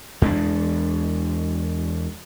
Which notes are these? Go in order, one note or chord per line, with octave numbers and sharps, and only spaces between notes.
E2 G#3 C4 D4